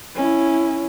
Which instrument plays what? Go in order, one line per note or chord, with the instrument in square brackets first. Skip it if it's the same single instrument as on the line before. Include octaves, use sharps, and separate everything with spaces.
[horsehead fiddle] C#4 E4